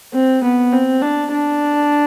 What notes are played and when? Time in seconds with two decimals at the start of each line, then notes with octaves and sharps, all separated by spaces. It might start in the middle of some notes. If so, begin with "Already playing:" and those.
0.13 C4
0.43 B3
0.73 C4
1.02 D4
1.33 D4